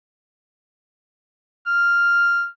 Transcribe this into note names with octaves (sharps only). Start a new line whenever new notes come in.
F6